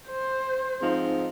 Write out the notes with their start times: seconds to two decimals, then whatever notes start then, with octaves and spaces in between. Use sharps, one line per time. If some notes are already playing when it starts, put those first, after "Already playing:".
0.08 C5
0.79 G#2 F3 C4 D#4